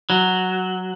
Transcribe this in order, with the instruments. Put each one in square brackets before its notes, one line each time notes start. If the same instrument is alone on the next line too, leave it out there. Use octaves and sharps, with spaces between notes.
[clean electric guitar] F#3